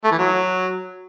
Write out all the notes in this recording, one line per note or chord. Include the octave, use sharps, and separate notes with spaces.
A3
E3
F#3